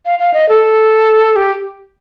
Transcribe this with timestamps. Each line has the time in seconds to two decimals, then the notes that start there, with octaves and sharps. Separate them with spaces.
0.05 F5
0.19 F5
0.34 D#5
0.49 A4
1.36 G4